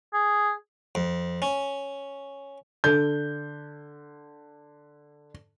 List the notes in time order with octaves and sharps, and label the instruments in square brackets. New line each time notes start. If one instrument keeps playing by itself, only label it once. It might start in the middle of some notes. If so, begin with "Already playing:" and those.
[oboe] G#4
[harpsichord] F2
C#4
[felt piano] D3 G6